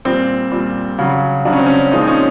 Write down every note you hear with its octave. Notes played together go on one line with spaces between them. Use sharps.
A#2 G3 C4
A#2 G3
C#3 F#3
C#3 F#3 D4
C#4
C4
C#4
A#2 F3 G#3 D#4
C4
C#4